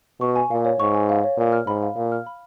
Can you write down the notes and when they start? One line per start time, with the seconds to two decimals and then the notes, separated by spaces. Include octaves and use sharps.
0.20 B2 C#6
0.36 G#5
0.50 A#2 F5
0.65 C#5
0.80 G#2 C#6
0.94 G#5
1.09 F5
1.24 C#5
1.38 A#2 F5
1.52 F6
1.67 G#2 B5
1.83 F5
1.96 A#2 F5
2.12 F6
2.27 B5